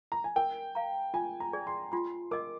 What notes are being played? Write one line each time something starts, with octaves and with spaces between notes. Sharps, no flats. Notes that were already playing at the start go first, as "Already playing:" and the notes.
A#5
G#5
A#4 G5
F5 A#5
F4 G#5
A#5
G#4 D5
C6
F4 C6
A#4 D#5 D6